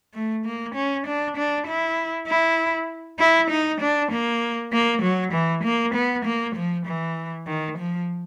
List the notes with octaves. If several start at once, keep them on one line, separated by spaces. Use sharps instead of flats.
A3
A#3
C#4
D4
D4
E4
E4
E4
D#4
D4
A#3
A#3
F#3
E3
A#3
B3
A#3
F3
E3
D#3
F3